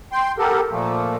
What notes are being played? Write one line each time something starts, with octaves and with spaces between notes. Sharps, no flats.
G5 C6
B3 G4 A4 A#4
A#2 F3 A3 A#3